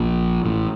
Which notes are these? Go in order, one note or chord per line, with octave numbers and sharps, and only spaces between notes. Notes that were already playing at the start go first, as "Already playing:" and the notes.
Already playing: A#1 A#2
A1 A2